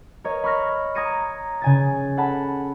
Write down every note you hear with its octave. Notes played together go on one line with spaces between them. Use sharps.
A#4 C#5 D#5
B5 C#6 F6 A#6
A#5 D#6 G#6 A#6 C#7 D#7
C#3 G#5 A6
A4 F#5 A5 B5